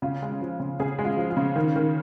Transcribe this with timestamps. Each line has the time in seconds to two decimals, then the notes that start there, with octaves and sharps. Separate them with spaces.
0.02 C#3 F4
0.22 G#3
0.41 F3
0.60 C#3
0.80 C#3 G#4
0.99 G#3
1.05 F4
1.17 F3
1.30 F4
1.37 C#3
1.56 D#3
1.76 D#3